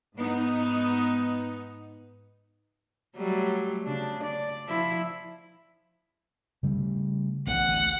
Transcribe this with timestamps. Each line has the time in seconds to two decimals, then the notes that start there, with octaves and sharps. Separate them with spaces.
0.16 G#2 B3 D#4
3.16 F#3 G3 A3
3.86 C#3 D4
4.23 D5
4.66 F3 E4
6.63 C#3 G3 A3
7.47 A1 D2 A3 F#5